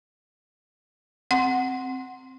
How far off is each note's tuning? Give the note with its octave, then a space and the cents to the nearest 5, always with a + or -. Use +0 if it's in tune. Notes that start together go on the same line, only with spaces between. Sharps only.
C4 +0 F#5 +0 C6 +0